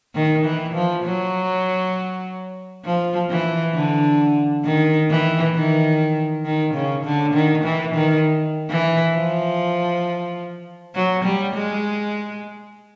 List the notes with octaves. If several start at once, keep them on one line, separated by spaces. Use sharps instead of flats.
D#3
E3
F3
F#3
F3
E3
D3
D#3
E3
D#3
D#3
C#3
D3
D#3
E3
D#3
E3
F3
F#3
G3
G#3